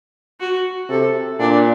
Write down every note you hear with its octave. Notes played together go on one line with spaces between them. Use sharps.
F#4
C3 A4
A#2 D4